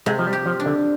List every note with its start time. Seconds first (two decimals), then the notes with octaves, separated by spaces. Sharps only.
0.06 C3 G#3
0.19 F3
0.27 G3
0.33 G4
0.46 F3
0.60 D4
0.66 D3